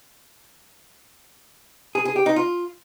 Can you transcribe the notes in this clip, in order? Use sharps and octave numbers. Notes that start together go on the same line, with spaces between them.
G#4
G#4
G4
D#4
F4